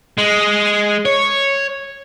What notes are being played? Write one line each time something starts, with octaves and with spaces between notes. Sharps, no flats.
G#3
C#5